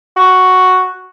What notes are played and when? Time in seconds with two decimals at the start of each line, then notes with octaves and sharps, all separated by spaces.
0.17 F#4